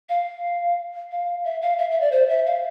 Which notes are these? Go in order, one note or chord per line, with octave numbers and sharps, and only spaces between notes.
F5
F5
E5
F5
E5
E5
D5
C5
E5
F5